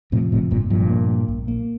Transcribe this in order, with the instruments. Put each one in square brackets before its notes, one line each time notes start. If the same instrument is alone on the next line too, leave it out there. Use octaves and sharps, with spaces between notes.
[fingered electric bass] F2 [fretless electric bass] A2 C3
[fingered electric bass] F1 [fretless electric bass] A2 C3
[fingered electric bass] F1 [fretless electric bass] G2 A#2
[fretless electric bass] G2 A#2 [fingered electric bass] F3
[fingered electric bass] A#3
A#3
A#1
A#3